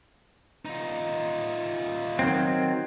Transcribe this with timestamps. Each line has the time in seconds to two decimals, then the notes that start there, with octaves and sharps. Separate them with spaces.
0.65 D#4 F4
2.19 D#3 F#3 C4